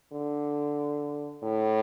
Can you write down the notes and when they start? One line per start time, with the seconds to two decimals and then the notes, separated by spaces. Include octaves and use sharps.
0.13 D3
1.43 A2